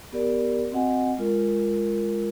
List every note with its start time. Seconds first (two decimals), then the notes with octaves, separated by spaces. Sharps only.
0.12 B3 G4 A#4 D5
0.72 C4 F#4 D#5 F#5 G#5
1.18 G#3 F4 A#4